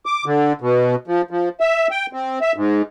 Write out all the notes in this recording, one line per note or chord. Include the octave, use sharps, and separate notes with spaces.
D6
D3
B2
F3
F3
E5
G5
C4
E5
G#2